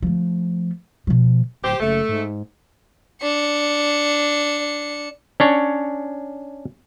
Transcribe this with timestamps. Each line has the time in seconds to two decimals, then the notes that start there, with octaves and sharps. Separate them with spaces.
0.02 F3 A3
1.07 B2 F3
1.63 D1 G4 C5
1.80 F#1 A3
2.09 G#2
3.23 D4 C#7
5.40 C#4 D4 C#5